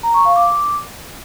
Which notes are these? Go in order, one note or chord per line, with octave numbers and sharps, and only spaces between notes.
A#5
C#6
F5
D6